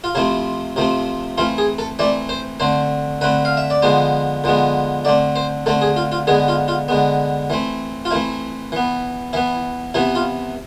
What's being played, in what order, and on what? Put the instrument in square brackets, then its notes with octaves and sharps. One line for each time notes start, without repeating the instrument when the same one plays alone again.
[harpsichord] F4
C3 F3 A3 C4 E4
C3 F3 A3 C4
E3 A3 C4 F4
G#4
A4
E3 A3 C4 D5
C5
D3 A3 C4 C5
D3 A3 C4 B4
F5
E5
D5
D3 F3 G#3 B3 C5
D3 F3 G#3 B3
D3 A3 C4 D5
C5
D3 A3 C4 A4
G#4
F4
F4
D3 G#3 B3 G#4
F4
F4
D3 G#3 B3
E3 A3 C4
F4
E3 A3 C4 E4
E3 B3
E3 B3 E4
C3 E3 B3 E4
F4